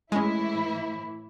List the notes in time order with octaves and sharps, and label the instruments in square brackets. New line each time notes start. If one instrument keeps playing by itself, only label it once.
[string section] A2 E3 E4 [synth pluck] G#3 C#4